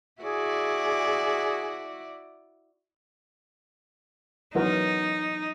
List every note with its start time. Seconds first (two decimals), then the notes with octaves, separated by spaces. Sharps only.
0.22 E4 F#4 G#4 D5
4.55 E3 F#3 D#4 A#4